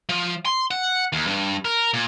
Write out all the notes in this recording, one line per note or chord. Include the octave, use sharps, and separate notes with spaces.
F3
C6
F#5
D#2
G2
A#4
A#2